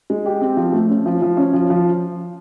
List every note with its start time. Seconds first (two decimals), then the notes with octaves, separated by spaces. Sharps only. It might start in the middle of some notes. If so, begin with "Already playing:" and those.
0.10 G#3
0.26 G4
0.41 C4
0.57 F3
0.73 A3
0.89 C#4
1.06 F3
1.22 F3
1.37 C#4
1.54 F3
1.70 F3